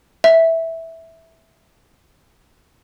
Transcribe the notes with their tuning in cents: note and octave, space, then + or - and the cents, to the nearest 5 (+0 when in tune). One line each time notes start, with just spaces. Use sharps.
E5 -10